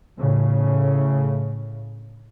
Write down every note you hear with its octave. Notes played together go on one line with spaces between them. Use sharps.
A2 C#3